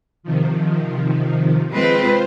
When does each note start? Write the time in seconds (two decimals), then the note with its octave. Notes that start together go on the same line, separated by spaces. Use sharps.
0.23 C3 D#3 F3
1.72 G#3 C4 F4 B4 C5